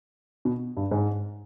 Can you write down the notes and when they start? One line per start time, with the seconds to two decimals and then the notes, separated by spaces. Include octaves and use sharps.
0.45 B2
0.77 G2
0.91 G#2